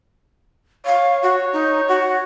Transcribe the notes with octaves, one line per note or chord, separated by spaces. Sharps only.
C#5 F5
F#4
D#4
F#4